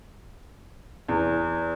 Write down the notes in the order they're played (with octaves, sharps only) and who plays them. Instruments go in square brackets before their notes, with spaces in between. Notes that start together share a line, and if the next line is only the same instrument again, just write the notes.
[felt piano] E2